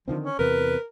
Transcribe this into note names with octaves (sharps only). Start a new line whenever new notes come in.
D3 D#3 F3 C4
C#4
E2 C3 A#4 B4